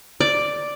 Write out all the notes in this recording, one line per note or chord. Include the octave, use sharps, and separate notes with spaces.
D5